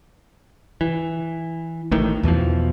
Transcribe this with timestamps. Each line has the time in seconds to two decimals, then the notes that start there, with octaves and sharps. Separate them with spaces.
0.81 E3
1.91 A1 A2 D#3
2.23 E2 B2 E3 F3